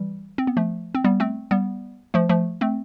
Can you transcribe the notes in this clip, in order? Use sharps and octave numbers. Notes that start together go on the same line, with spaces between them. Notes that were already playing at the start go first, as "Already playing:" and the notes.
Already playing: E3 G3
C4
B3
F3 A3
C4
G3 B3
A3 C4
G3 B3
F3 A3
F3 A3
A3 C4